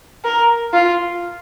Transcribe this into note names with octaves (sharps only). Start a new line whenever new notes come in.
A#4
F4